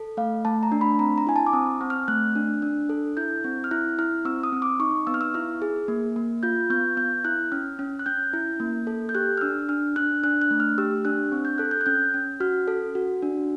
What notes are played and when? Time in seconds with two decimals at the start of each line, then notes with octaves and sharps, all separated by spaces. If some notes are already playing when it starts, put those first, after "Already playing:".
Already playing: A4
0.17 A3 F5
0.45 A3 A5
0.63 A#5
0.72 D4
0.81 B5
0.99 C4 A#5
1.18 A#5
1.27 E4 G#5
1.36 A5
1.47 D6
1.53 C4 D#6
1.81 C4
1.90 F6
2.08 A3 F#6
2.35 D4
2.62 D4
2.89 A4
3.17 E4 G6
3.44 C4
3.64 F6
3.71 E4 F#6
3.98 E4 F6
4.25 C4 E6
4.44 D#6
4.52 C4
4.62 D6
4.80 D#4 C#6
5.07 B3 E6
5.14 F6
5.21 E6
5.34 E4 F6
5.62 G#4
5.88 A#3
6.16 A#3
6.43 F4 G6
6.70 B3 G6
6.97 B3 G6
7.25 E4 F#6
7.52 C#4 F6
7.79 C#4
7.99 F#6
8.06 C#4 G6
8.33 E4
8.60 A#3
8.87 A4
9.09 G6
9.15 G4 F#6
9.38 F6
9.41 D4 E6
9.69 D4 F6
9.96 D4 F#6
10.23 D4 F#6
10.41 F#6
10.51 A3
10.60 F6
10.78 G4 E6
11.05 D4 F#6
11.32 C4
11.45 G6
11.58 A4 F#6
11.71 G6
11.81 F#6
11.86 C#4 G6
12.14 C#4
12.40 F#4 F6
12.68 A4
12.95 F#4
13.22 D4